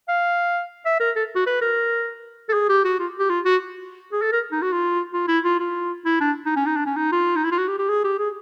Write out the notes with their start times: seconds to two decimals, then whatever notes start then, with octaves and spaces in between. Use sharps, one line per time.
0.08 F5
0.85 E5
1.00 A#4
1.16 A4
1.36 F#4
1.47 B4
1.61 A#4
2.49 A4
2.53 G#4
2.69 G4
2.84 F#4
2.99 F4
3.19 G4
3.29 F4
3.45 F#4
4.12 G#4
4.22 A4
4.32 A#4
4.52 D#4
4.62 F#4
4.72 F4
5.13 F4
5.28 E4
5.44 F4
5.60 F4
6.06 E4
6.21 D4
6.46 D#4
6.56 C#4
6.66 D#4
6.76 D4
6.86 C#4
6.96 D#4
7.12 F4
7.36 D#4
7.44 E4
7.51 F4
7.58 F#4
7.68 G4
7.79 G4
7.89 G#4
8.04 G4
8.19 G#4